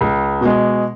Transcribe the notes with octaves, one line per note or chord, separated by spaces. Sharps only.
C#2
B2 G#3